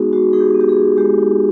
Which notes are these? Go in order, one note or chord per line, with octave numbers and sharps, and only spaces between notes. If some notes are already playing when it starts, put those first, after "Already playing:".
Already playing: G#3 B3 D#4 F#4 G#4
G#3 F#4
D#4 G#4
G4
B3
G4
G#4
F#4
G#3 G4
D#4